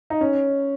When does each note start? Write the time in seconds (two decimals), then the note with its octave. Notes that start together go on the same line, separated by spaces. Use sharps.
0.10 D#4
0.21 C#4